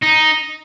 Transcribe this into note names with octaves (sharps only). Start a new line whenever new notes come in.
D#4